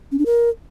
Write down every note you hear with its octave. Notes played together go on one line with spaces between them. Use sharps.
C#4
D4
A#4